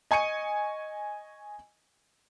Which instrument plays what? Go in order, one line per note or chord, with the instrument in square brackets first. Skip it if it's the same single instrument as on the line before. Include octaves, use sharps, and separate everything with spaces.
[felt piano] D#5 G#5 C#6 C#7 D#7